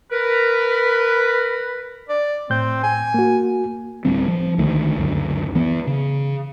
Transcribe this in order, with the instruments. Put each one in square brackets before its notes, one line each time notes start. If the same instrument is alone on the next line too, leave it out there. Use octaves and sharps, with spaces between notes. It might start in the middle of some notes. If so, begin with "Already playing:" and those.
[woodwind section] A#4 B4
[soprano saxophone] D5
[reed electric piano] A2 G6 [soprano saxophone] C4
[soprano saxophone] G#5
[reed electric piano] A#3 F#4
[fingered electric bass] D1 D2 G3 C4
F3
C#2 D3 D#3 A3
C#2 F#2 D3
E3 B3
C#3